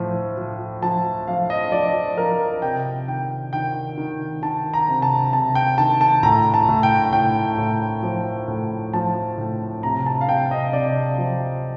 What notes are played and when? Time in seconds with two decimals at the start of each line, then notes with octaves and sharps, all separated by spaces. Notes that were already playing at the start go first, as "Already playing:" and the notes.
Already playing: A2 F3
0.38 F3
0.82 F3 A5
1.27 F3 F5
1.50 D#5
1.72 F3 D5
2.17 F3 A#4
2.62 C3 G5
3.07 D#3 G5
3.53 D#3 G5
3.98 D#3
4.42 D#3 A5
4.74 A#5
4.88 C3
5.02 A5
5.32 C3 A5
5.55 G5
5.78 D#3 A5
6.01 A5
6.23 A2 A#5
6.54 A5
6.69 A2
6.83 G5
7.13 A2 G5
7.58 A2
8.03 F3
8.48 A2
8.93 F3 A5
9.38 A2
9.83 C3 A#5
10.06 A5
10.21 F5
10.28 C3 G5
10.51 D#5
10.73 C3 D5
11.18 F3